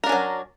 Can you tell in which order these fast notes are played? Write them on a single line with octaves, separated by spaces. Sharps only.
A#4 D4 C#4 F#3